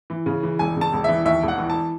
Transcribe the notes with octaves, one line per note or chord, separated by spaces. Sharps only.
E3
C#3
E3
E1 G#5
C#3
A5
E1
E3 E5
D#2 E5
E1
F#5
E3
A5